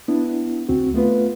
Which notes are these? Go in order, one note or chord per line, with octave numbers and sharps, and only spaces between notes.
B3 D4 E4
D2 C4 F#4
A3 B3 F4 B4